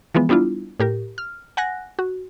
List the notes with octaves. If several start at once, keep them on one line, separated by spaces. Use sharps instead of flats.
E3 F3 G#3 B3
G3 B3 D4 E4 F4
A2 G4 A#4
F6
F#5 G#5 F#6 A#6
F#4